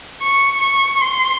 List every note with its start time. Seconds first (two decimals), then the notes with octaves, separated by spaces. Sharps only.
0.22 C#6
0.63 C#6
1.01 C6